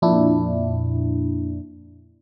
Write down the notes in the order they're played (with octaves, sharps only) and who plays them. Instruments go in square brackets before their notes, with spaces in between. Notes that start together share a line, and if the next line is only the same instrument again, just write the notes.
[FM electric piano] F2 A#2 D4 E4